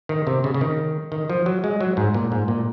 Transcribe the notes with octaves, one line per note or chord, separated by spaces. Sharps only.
D#3
C3
C#3
C#3
D#3
D#3
F3
F#3
G#3
F#3
G#2
A#2
G#2
A#2